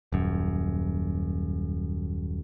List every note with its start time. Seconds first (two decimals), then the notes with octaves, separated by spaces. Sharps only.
0.12 D#1 F#2